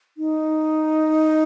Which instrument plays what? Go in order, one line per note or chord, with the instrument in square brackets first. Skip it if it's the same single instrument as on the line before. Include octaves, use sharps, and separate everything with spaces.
[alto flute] D#4